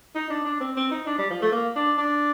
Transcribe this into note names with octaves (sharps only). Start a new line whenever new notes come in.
D#4
D4
D4
C4
C4
D#4
D4
G3
F3
A3
A#3
D4
D4